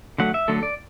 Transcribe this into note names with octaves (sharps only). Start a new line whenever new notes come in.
D3 F#3 A3 F#5
E5
D3 F#3 A3 A4
D5